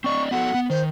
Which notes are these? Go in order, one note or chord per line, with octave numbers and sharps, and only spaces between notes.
C4 D5 D#5 C#6
B3 F#4 A4 F#5
B3
D#3 C5